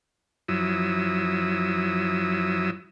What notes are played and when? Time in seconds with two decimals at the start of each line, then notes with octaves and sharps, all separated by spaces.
0.48 F#2 F3 F#3 E4 D#6 E6